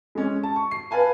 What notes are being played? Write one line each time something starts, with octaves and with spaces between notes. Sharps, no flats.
G#3 C#4
A5
C#6
C7
B4 F5 G#5 A5